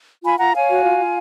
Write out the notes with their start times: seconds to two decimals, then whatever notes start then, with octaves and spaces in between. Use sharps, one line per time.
0.24 F4 G#5 B5
0.39 F4 F#5 A#5
0.54 C#5 F5 G#5
0.69 F#4
0.84 F4
0.98 F4